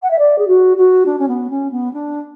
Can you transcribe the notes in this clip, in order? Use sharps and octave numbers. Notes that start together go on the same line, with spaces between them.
F#5
E5
D5
G#4
F#4
F#4
D4
C#4
B3
C#4
B3
D4